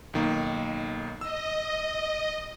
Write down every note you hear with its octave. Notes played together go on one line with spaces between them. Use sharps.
B1 D#3 A#3
D#5 E6